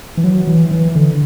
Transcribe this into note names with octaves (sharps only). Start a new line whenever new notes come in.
E3
F#3
E3
E3
D3